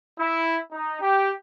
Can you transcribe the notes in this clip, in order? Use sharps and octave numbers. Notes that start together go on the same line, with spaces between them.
E4
D#4
G4